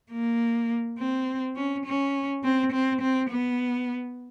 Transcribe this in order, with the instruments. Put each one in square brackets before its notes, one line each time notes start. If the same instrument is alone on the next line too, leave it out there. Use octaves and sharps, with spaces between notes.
[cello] A#3
C4
C#4
C#4
C4
C4
C4
B3